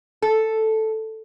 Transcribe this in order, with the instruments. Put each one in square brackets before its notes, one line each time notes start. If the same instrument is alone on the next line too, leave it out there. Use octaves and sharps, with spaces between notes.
[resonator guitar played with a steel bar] A4